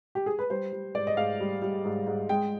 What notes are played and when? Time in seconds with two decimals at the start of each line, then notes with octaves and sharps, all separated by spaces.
0.15 G4
0.26 G#4
0.39 B4
0.50 G3 C5
0.72 G3
0.95 G#2 D5
1.07 D#5
1.17 G#2 F5
1.40 G3
1.62 G3
1.85 G#2
2.07 G#2
2.29 G#3 G5